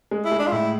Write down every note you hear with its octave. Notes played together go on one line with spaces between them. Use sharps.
G#3
E4
G#3
D4
F4
A2 E4